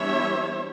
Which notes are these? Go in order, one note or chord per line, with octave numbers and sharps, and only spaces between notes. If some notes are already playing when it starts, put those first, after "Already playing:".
Already playing: E3 G3 B3 D4 C#5 E5